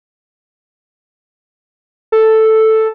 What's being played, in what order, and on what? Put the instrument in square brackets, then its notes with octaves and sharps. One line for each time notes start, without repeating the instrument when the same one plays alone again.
[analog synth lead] A4